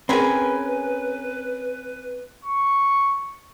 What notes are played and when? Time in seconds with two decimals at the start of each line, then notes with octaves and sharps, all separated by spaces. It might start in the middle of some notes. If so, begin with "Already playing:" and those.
0.09 C4 C#4 G#4 A#4 B4 G#5 B5
2.45 C#6